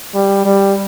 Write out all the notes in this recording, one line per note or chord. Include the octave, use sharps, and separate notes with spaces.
G3
G3